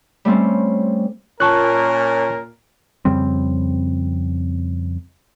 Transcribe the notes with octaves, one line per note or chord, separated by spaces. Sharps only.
G3 A3 C4 C#4
A#2 C#4 A#4 A5 C#6 F#6
F2 C#3 G3 C4